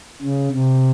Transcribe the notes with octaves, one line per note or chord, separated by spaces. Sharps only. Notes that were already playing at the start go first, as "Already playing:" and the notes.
C#3
C3